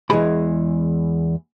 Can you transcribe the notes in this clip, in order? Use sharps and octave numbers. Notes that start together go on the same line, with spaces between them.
E2 E3 F3 G#3 G#4 B5